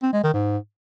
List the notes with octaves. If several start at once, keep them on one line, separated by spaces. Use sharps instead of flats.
C4
G#3
D#3
G#2